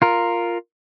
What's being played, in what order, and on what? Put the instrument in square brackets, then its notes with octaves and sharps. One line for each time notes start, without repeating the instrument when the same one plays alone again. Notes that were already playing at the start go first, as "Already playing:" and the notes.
[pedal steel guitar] F4 A#4